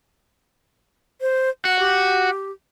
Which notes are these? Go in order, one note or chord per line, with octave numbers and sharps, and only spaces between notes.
C5
F#4 F#5
G4